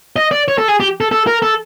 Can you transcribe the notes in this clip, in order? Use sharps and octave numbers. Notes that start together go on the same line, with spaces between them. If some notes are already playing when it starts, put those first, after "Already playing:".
D#5
D5
C#5
A4
G#4
G4
A4
A4
A#4
A4